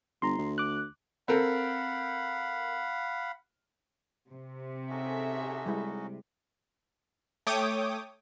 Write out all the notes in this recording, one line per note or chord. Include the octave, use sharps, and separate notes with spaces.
G1 A#5 C6
D2
D6 F#6
C4 A4 A#4 F5 F#5 B5
C3
C#4 D#4 F#4 G#4 A4 E5
G3 G#3 E4
A3 C#5 G5 D6 D#6